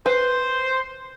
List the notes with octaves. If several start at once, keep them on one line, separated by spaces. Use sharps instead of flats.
B4 C5